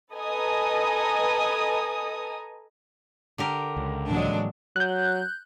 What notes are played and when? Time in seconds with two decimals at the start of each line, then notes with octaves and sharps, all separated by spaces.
0.13 A4 B4 D#5 G#5 A#5 D#6
3.38 D3 G4 A#4
3.76 C#2
4.10 A2 E3 F#3 G#3 A#3 D4
4.76 F#3 F#6 G6